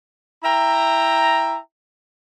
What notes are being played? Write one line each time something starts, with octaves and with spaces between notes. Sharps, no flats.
E4 E5 G5 A#5